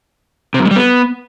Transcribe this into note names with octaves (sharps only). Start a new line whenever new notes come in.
C3
F#2
G#3
G3
B3